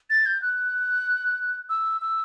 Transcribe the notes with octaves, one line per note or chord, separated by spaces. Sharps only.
A6
G6
F#6
E6
E6